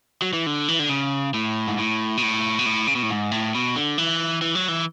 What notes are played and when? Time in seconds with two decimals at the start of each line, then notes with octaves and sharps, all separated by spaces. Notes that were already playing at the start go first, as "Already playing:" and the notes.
0.22 F#3
0.33 E3
0.46 D3
0.68 E3
0.79 D3
0.90 C#3
1.34 A2
1.68 G#2
1.78 A2
2.17 B2
2.23 A2
2.59 B2
2.66 A2
2.87 C#3
2.95 B2
3.03 A2
3.10 G#2
3.32 A2
3.55 B2
3.76 D3
3.98 E3
4.42 E3
4.55 F#3
4.68 E3